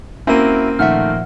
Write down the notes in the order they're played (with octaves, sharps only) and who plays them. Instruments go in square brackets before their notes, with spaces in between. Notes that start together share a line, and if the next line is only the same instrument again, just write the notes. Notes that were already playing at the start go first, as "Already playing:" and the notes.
[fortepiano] A#3 C4 [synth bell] C#4 D#7 [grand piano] E4 F#4 A#4
[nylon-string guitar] A#2 F3 E5 [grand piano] D#3 A3 [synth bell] F#5 F6